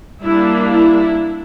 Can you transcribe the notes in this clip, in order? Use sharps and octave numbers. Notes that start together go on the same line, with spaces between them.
G3 A#3 D4 E4
E4